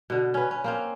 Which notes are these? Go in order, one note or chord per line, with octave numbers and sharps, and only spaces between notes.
B2 D3
C#4 B4
C#4
A#3 C4 C#4